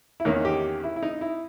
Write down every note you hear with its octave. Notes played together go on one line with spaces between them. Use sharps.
E4
E2 D#3 A#3 C#4 D#4
G4
E4
E4
D#4
E4